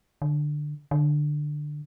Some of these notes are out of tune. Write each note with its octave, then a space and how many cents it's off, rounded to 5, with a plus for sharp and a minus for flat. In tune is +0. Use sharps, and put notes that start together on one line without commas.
D3 +15
D3 +15